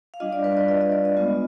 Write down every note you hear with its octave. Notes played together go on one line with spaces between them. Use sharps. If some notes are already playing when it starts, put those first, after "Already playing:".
F5
G3 D4 F4 D#5
D5
B4
D5
D#5
D#5
D5
D#5
G#3 B3 F4